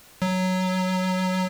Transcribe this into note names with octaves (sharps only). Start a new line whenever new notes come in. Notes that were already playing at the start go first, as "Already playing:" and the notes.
F#3